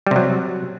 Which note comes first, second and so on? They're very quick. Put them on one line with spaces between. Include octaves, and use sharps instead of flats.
G3 C3 F#3